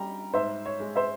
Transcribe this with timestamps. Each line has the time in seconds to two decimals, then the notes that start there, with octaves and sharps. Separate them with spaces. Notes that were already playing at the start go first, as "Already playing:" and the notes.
Already playing: G3 G5 A#5
0.33 G#2 C5 E5
0.66 C#5
0.80 G#3
0.96 C5 E5